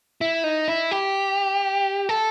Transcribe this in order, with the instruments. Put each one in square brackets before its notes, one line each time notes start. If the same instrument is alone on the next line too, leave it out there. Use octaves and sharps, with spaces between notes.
[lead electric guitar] E4
D#4
E4
G4
A4